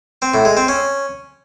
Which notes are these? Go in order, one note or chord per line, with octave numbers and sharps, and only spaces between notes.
C4
A2
G#3
C4
C#4